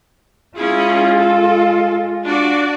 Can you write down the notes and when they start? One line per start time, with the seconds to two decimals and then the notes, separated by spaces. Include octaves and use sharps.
0.57 G#3 C#4 E4 F4 G#4
1.18 A4
2.25 D4 F#4 D5